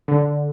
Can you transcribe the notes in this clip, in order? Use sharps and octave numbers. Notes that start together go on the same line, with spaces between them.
D3